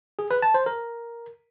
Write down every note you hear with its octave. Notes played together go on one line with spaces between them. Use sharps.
G#4
B4
A5
C5
A#4